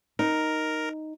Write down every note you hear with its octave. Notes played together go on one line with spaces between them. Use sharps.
D#4 A#4